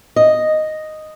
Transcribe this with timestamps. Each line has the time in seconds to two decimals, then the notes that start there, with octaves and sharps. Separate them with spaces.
0.16 D#5